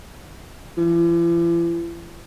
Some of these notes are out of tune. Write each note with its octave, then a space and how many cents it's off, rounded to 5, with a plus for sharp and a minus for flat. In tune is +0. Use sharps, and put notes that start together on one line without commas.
E3 +45